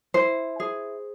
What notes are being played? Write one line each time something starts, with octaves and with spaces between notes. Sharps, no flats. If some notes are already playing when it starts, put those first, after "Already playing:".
E4 C5
G#4